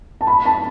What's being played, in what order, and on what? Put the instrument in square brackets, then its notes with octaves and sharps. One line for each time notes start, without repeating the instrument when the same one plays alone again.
[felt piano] A5
B5
A5